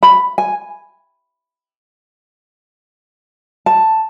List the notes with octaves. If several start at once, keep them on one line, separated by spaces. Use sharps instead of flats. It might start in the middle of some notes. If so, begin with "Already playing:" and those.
B5
G#5
A5